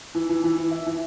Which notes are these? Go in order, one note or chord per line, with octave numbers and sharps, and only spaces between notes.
E3
E3
E3
E3
E4
E3